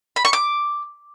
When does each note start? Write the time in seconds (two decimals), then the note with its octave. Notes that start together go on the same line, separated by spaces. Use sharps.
0.16 B5
0.25 C#6
0.33 D6